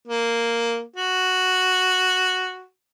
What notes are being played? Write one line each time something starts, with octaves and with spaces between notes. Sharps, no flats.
A#3
F#4